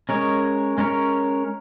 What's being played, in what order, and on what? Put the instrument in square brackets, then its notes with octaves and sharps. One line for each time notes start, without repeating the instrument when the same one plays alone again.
[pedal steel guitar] G#3 C#4 A#4 C#5
G#3 C#4 A#4 C#5